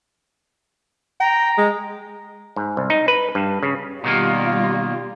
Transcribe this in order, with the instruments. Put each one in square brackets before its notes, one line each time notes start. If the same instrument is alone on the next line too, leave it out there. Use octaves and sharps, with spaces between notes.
[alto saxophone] G5 [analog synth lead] A#5
[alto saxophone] G#3
[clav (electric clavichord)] G#2
C2
D#4
B4
G2
C#3
[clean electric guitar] B2 D#3 A#3 [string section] G3 F4